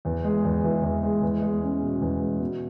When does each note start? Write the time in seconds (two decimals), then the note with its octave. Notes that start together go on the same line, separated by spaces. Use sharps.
0.05 E2
0.24 G#3
0.44 E2
0.64 E3
0.83 E2
1.03 G#3
1.22 E2
1.42 G#3
1.63 C#4
1.82 B2
2.01 E2
2.21 G#3
2.40 B2